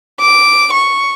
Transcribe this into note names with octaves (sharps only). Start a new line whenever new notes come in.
D6
C#6